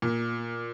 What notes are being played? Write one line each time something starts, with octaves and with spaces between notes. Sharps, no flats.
A#2